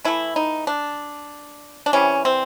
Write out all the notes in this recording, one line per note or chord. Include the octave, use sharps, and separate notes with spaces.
E3 A3 E4
D#4
D4
D4
C3 E3 G3 C#4
C4